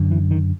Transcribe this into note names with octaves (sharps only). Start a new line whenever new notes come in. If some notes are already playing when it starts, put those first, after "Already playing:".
Already playing: F#2 D3
E3
D#3